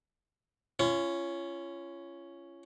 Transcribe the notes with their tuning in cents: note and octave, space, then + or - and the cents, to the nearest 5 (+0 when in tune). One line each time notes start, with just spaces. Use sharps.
C#4 +0 F4 -35